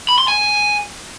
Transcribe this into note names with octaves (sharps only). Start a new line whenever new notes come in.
B5
C6
G#5